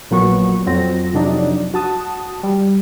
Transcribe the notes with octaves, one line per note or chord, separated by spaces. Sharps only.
A#1 A#2 F#3 B3 F#4 C#6
F2 F#3 C4 A#6
F2 C3 F#3 D4 D#4
F#4 A5 D#6
G3